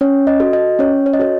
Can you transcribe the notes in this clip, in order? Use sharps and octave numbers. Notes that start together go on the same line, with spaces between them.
C#4 C#5
D#5
F#4 A4
D#5
C#4 C#5
C#5
D#5
F#4 A4 C#5